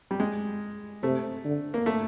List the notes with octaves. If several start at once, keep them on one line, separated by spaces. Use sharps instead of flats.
G3
G#3
C3 A3
D3
A#3
A3